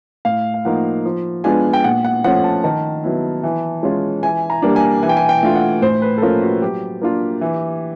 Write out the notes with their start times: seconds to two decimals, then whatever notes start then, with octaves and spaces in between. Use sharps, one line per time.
0.25 A2 F5
0.54 F5
0.65 F3 A#3 D#4 F#5
1.05 F3
1.44 G#3 B3 D4 F4 G#5
1.73 G5
1.84 A#2 F#5
2.05 F#5
2.24 F3 A3 C#4 F#5
2.44 A5
2.64 D#3 A5
3.04 F#3 B3 E4
3.43 E3
3.83 G#3 C#4 F4
4.23 E3 G#5
4.50 A#5
4.62 G3 A#3 D4
4.76 G#5
5.03 E3 G#5
5.09 G5
5.17 G#5
5.29 G5
5.43 A3 D4 F4
5.55 F#5
5.82 A2 C5
6.02 B4
6.18 A4
6.22 F3 A#3 C#4 F4 A#4
6.42 F#4
6.62 F#3 G4
7.02 A#3 D4 F4
7.41 E3